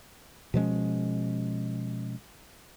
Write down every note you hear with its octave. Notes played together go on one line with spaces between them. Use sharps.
B2 F3 G#3 C#4